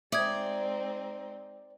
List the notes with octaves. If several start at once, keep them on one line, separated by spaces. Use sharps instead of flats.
G#3 C4 D#4 D5 E5 D#6 G#6